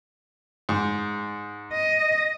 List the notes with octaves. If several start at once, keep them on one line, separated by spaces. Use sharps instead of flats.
G#2
D#5